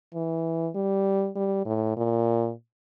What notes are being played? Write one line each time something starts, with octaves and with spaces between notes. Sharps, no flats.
E3
G3
G3
A2
A#2